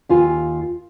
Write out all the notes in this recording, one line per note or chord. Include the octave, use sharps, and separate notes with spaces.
D#2 F4 G#5